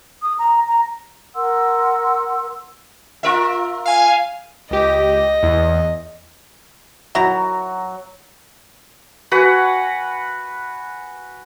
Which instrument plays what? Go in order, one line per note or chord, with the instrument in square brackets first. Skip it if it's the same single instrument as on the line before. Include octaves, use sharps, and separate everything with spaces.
[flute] D#6
A#5
A#5
[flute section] A#4 F#5 C6 E6
[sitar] F4 A#4 E5
[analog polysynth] F5 G#5
[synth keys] C#2 G4 [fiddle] D#5
[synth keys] E2
[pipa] D#3 E4 A#5 [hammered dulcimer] F#3 [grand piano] F#4
[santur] F#4 B4 F#5 G#5